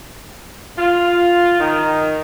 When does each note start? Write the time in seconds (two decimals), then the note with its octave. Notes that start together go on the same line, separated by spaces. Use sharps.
0.78 F4
1.60 D#3